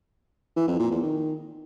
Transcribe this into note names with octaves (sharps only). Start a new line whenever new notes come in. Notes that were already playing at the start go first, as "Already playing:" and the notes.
E3
F2
A#2
E2
D#3